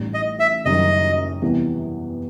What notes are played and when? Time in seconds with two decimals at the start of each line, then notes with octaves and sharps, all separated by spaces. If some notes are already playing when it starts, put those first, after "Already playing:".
Already playing: A1 A2 G3 D#4
0.14 D#5
0.40 E5
0.65 F#1 F#2 D#3 G3 D#5
1.42 E2 C3 E3 G3 B3